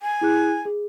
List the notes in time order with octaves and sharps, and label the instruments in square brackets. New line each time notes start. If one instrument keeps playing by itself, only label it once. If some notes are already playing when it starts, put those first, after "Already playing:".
[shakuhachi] G#5
[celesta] E4 G#4 F#6
G#4